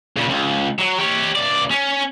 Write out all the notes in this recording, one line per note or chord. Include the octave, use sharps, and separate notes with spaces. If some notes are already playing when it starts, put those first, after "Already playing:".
A#2 C#3
C#2
F#3
G4 C#5
C#2 D5
C#4